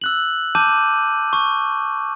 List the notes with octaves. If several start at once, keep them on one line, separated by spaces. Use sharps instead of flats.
E6 F#6 F#7
A5 D6 G6 D#7
C#6